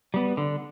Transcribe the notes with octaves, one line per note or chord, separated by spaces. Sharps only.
G3 B3
D3